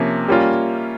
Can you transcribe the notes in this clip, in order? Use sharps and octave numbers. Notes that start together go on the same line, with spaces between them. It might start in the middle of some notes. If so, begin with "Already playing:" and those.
Already playing: C3 F3 A#3 C#4
G3 A#3 C#4 F4